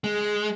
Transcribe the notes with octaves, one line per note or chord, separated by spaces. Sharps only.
G#3